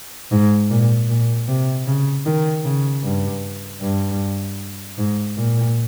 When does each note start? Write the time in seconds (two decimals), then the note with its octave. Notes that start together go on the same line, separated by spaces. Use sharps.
0.31 G#2
0.70 A#2
1.09 A#2
1.48 C3
1.87 C#3
2.26 D#3
2.65 C#3
3.03 G2
3.81 G2
4.98 G#2
5.37 A#2